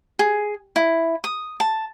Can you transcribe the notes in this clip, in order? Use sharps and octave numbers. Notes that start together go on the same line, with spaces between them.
G#4
E4
D#6
A5